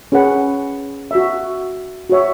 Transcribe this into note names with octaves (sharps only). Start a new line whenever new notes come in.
C#4 G#4 B4 F#5
F#4 E5
F#4 C#5 E5